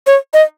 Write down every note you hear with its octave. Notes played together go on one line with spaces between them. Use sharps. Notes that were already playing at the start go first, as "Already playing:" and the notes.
C#5
D#5